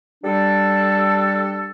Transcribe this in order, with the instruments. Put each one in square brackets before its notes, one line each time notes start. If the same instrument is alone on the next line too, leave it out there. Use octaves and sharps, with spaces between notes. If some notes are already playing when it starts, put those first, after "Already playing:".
[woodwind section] G3 D4 A4